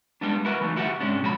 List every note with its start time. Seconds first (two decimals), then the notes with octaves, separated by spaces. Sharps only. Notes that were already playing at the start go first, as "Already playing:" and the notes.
0.21 G3 G#3 B3 D4
0.45 E4 F#4 A#4 B4 F#5
0.61 E3 F#3 A3 D#4
0.75 D2 E4 F#4 G4 E5 F#5
1.00 G#2 C3 G#3 C#4 D4
1.22 B2 F3 F#4 C#5 B5